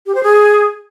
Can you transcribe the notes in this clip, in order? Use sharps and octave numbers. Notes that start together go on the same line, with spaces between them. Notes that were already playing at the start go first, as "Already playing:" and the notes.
G4
C5
G#4